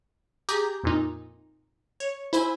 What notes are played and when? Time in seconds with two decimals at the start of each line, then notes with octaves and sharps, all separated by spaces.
0.49 G4 G#4 A#5 D6 G6
0.83 F2 A#2 D#4
2.00 C#5
2.33 E4 C5 G#5 B5